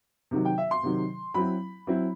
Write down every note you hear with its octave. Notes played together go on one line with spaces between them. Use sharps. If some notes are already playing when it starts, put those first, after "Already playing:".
C3 D#3 F#3
G5
E5
C6
C3 D#3 F#3
F#3 C4 E4 B5
F#3 C4 E4